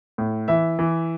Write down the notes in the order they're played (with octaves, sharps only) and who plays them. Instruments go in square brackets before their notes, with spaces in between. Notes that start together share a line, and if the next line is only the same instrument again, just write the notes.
[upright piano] A2
E3 E5
E3